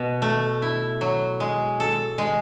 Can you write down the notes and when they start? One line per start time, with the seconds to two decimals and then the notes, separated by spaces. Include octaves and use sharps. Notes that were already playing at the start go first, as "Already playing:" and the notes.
Already playing: B2
0.22 A3
0.62 E4
1.01 F#3
1.40 G#3
1.80 A4
2.18 G#3